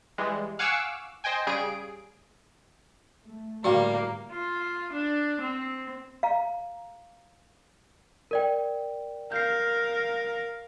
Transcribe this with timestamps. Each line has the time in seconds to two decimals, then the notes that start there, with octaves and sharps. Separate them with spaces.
0.18 E3 G3 G#3
0.59 F5 F#5 G#5 C#6 D6 E6
1.24 C5 D#5 G5 G#5
1.47 C#3 G3 G#4 D7
3.25 A3
3.64 A2 D3 G3 A#3 F#4 F5
4.31 F4
4.92 D4
5.41 C4
6.23 F5 A#5
8.31 A#4 D5 G5
9.32 A#4 F5 G6 C7